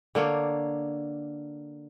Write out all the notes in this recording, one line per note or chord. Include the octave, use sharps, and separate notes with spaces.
D3 A#3 D4 C#5